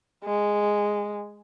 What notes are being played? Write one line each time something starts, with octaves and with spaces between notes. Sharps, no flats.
G#3